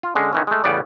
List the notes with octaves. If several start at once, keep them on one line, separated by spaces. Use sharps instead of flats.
F4
D3 G#3 C#4
D#3 E3 C#4
G#3 A3
A1 C#3 G3 B3 D5